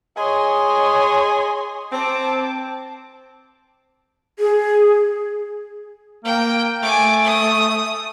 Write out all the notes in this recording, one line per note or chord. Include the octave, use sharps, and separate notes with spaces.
G#4 C#5 D#5 C6
C4 A5 D6
G#4
A#3 G5
A3 G#5 D6
D#6